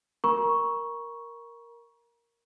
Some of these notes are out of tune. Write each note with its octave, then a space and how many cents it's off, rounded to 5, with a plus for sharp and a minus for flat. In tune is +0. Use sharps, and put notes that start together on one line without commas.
A#4 +0 A#5 +35 C#6 +0